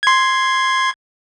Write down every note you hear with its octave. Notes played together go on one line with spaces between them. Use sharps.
C6 G#6